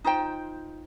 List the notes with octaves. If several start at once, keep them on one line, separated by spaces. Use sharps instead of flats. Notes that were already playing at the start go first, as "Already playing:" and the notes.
D#4 F4 C5 G5